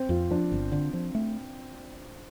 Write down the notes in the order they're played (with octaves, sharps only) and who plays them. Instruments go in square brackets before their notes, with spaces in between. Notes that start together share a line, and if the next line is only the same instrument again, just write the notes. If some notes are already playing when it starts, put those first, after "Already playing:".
Already playing: [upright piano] C4
[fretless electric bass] F2 [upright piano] F4
[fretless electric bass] F3 [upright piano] D4
[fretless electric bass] G1
D3
F3
A3